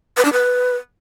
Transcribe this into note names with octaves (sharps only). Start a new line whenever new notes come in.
B4
D4
B4